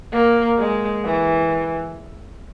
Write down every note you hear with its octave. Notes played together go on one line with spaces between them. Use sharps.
A#3
G#3
E3